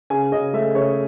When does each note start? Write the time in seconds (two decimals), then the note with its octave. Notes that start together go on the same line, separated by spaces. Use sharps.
0.10 C#3 G#5
0.32 C#3 D#5
0.53 A3 E5
0.75 C#3 C#5